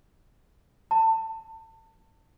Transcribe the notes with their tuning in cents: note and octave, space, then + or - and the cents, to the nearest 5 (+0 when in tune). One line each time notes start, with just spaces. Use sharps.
A5 +25